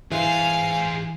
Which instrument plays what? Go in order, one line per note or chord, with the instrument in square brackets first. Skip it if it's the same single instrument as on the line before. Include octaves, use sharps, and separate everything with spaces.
[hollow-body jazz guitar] E3 [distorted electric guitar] G#4 C5 [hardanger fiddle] F5 [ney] G#5